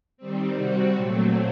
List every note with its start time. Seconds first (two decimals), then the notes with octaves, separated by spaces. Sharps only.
0.17 D#3 G3 C4
0.56 C3 G3 C4 F#4
0.95 A#2 F#3 A3 C4